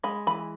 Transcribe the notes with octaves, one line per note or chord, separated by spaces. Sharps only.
G#3 B5
E3 B5